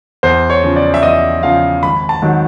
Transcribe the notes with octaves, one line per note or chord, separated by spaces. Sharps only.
E2 C5
C#5
C#3 F3
D5
E5
E2 D#5
C#3 F3 F5
G#1 B5
A5
G#2 D#3 F#3